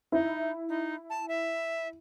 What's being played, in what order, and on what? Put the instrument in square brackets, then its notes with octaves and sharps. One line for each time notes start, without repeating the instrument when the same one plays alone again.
[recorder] D#4 [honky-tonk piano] E4
[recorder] D#4
A5
E5